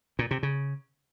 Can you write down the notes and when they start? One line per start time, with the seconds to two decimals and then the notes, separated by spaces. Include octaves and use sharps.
0.19 A#2
0.31 C3
0.43 C#3